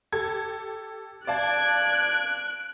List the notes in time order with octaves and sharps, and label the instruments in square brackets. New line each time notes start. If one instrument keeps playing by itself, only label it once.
[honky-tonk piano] G4 A4 G#6
[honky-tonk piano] D5 F5 A5 [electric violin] F#6 D7 [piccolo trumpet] G#6